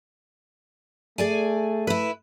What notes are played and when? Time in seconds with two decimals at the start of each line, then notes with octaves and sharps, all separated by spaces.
1.18 A3 G#4 D5 G#5
1.87 E4 B4